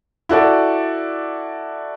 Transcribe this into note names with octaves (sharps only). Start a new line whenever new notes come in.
E4 F#4 A4 D5